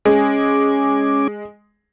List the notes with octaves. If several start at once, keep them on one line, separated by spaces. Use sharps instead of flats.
G#3 C#4 G#5 D6